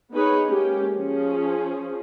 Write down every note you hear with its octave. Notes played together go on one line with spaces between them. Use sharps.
B3 D#4 G#4 B4 C#5
G#3 A#3 C#4 G4
F3 C#4 G#4